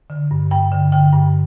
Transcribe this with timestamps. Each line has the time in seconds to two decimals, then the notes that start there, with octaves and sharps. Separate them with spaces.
0.10 D3
0.31 G2
0.51 G2 G5
0.71 D3
0.92 D3 G5
1.13 G2